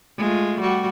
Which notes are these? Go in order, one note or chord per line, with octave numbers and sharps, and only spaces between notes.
G#3 A3 F4
G3 F#4